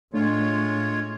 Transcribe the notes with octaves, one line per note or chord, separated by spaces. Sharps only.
A2 G#3 A3 D4 F4 C#5